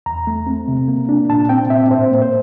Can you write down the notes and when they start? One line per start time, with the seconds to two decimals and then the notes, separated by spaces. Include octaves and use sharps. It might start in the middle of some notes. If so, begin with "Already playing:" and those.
0.06 E2 A#5
0.27 A3
0.47 C4
0.68 C3
0.88 A#3
1.09 D4
1.30 A#2 A5
1.49 C4 G5
1.70 A#2 E5
1.91 A2 C5
2.11 A#3
2.22 C5